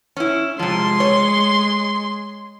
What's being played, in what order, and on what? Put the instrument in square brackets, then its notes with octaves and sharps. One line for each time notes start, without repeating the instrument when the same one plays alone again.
[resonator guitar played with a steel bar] C#4 E4
[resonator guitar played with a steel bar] C3 F3 [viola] G#3 C6
[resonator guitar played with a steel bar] C#5